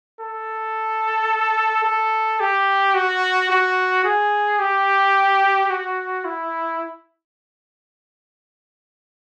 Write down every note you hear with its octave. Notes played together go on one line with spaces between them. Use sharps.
A4
A4
G4
F#4
F#4
G#4
G4
F#4
E4